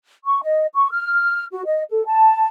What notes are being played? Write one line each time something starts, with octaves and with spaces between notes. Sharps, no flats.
C#6
D#5
C#6
F6
F#4
D#5
A4
A5